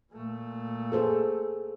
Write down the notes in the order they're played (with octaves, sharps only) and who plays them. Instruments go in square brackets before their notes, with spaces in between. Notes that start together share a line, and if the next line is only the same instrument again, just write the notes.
[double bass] A#2 A3
[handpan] G#4 A4 C5